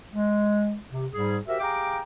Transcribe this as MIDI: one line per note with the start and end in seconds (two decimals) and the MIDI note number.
0.13 0.76 56
0.91 1.06 48
1.13 1.37 44
1.13 1.37 55
1.13 1.37 68
1.47 1.59 66
1.47 1.59 67
1.47 1.59 70
1.47 1.59 72
1.47 1.59 76
1.60 1.99 67
1.60 1.99 68
1.60 1.99 77
1.60 1.99 79
1.60 1.99 82
1.60 1.99 86